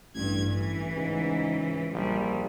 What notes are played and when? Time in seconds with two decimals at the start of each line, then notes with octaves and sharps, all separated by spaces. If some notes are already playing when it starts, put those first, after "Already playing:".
0.15 A1 G2 G#6
0.52 E3
0.96 C#2 G#2
1.93 A#1 G3